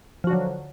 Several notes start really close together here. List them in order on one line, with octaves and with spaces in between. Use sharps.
F3 F#4 D3 F#3